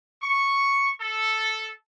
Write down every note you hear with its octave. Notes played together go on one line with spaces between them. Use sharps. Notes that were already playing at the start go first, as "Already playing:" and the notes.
C#6
A4